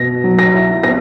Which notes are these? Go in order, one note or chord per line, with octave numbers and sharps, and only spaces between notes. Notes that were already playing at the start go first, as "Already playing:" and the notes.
Already playing: B2 A#6
F#3
A#6
E4
B3 A#6